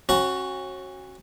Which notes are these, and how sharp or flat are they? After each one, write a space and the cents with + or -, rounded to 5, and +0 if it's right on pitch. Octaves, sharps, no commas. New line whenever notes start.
C#4 -35 F#4 +5 A#5 -40